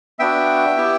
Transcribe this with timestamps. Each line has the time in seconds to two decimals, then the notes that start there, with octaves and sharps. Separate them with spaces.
0.19 B3 D4 F#4 E5 G5
0.77 B3 E4 G4